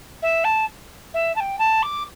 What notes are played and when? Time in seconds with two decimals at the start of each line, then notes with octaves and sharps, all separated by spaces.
0.22 E5
0.44 A5
1.13 E5
1.35 A5
1.40 G5
1.58 A5
1.82 D6